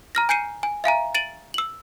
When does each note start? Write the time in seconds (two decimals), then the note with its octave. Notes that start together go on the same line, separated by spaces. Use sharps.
0.15 A#5 F6 A#6
0.29 G#5 G6 C7 C#7 D#7
0.63 G#5
0.84 E5 F5 G#5 A#5
1.15 A6 D7 D#7 F#7
1.54 E6 F#7